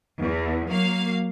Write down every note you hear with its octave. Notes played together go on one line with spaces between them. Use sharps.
E2
F#3 A#3 F5